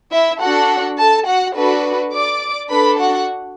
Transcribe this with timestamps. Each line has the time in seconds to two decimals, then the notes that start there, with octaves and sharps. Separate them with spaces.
0.12 E4 E5
0.41 D4 F#4 A4 F#5
0.99 A4 A5
1.27 F#4 F#5
1.56 D4 F#4 A4 B4
2.13 D5 D6
2.70 D4 A4 B4 B5
2.99 F#4 F#5